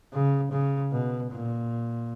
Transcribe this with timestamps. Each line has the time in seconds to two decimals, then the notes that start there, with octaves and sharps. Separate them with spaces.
0.13 C#3
0.52 C#3
0.92 B2
1.31 A#2